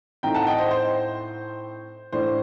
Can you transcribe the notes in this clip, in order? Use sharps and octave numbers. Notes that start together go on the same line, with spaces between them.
A2 A3 C4 D#4 G5 A#5
F#5 A5
D#5 G5
C5 D#5
C5
A2 A3 D4 C5